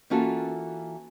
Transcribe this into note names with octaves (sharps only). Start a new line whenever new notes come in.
E3 A#3 C#4 F4 F#4 A4